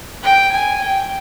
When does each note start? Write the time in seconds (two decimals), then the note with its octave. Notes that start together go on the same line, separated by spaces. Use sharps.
0.23 G5
0.52 G#5
0.82 G5